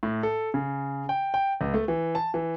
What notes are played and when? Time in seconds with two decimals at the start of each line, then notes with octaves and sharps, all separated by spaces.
0.03 A2
0.23 A4
0.54 C#3
1.09 G5
1.34 G5
1.61 C#2
1.74 A3
1.88 E3
2.15 A5
2.34 E3